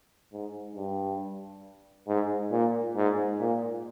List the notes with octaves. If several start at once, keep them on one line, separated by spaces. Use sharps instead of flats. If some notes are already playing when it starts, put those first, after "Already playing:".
G#2
G2
G#2
A#2
G#2
A#2